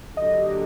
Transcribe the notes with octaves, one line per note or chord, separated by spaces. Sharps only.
D3 F#3 A#3 D4 G4 D#5